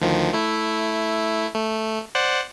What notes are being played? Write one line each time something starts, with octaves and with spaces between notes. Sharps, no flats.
D2 D#3 F3
A3 E4
A3
C5 D5 F#5